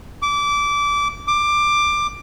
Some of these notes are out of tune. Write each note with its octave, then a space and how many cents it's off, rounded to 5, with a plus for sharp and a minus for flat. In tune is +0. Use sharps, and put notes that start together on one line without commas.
D6 -20
D6 +15